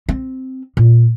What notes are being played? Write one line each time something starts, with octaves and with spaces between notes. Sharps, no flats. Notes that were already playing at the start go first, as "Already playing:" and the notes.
C4
A#2